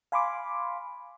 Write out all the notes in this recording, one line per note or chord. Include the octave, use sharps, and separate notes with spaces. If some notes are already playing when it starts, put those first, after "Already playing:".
F5 G#5 B5 C6 D6